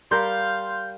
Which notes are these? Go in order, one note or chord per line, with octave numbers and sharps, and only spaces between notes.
G3 A#4 F5 C6 G6